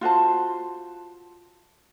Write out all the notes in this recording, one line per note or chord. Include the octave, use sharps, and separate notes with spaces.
F4 F#4 C5 A5